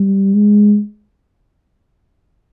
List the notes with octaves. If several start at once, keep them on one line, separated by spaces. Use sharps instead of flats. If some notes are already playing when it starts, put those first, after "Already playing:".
Already playing: G3
G#3